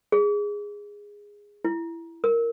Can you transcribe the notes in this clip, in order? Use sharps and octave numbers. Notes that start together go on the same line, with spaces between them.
G#4
E4
A#4